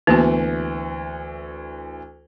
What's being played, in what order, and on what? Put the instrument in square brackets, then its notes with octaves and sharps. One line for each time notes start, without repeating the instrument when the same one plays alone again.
[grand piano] D2 E3 [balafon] A#3 B3 F#4